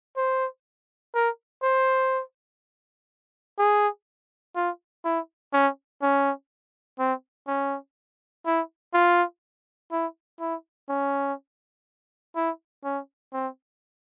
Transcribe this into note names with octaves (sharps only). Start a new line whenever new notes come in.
C5
A#4
C5
G#4
F4
E4
C#4
C#4
C4
C#4
E4
F4
E4
E4
C#4
E4
C#4
C4